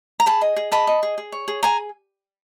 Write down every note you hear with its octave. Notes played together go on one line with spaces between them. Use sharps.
A#5
G#4 A5 B5
D#5
G#4
D#5 A5 B5
D#5
G#4
G#4
C#5
G#4
G#4 G#5 A#5